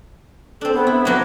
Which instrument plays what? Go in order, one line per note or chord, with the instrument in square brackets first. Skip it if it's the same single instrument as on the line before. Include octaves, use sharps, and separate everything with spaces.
[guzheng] C4 D4 [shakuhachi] A4
[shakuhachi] B3
[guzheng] E4
[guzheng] F3 F#3 A#3 [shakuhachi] B4